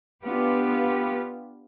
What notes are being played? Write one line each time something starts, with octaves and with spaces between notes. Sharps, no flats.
B3 D4 F4 G4 B4